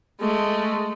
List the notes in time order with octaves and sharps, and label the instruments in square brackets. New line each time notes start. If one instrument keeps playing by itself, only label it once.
[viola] G#3 A3